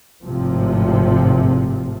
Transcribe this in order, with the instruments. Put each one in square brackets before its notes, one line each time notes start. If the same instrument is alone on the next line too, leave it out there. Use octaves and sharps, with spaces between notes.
[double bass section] G#1 A2 C3 F3